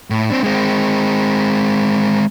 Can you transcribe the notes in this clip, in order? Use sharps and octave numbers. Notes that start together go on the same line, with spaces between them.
A2
C4 D4
G#3 C4